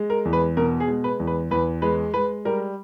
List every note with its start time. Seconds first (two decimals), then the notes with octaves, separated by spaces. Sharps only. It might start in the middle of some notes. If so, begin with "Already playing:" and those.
Already playing: G#3
0.10 A#4
0.25 E2
0.33 B4
0.57 B2 A#4
0.80 G#4
0.88 G#3
1.04 B4
1.20 E2
1.27 B4
1.51 E2 B4
1.82 G#3 B4
2.14 G#3 B4
2.45 G3 A#4